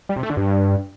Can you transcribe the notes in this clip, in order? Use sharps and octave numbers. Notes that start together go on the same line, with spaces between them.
G3
C3
A3
D3
G2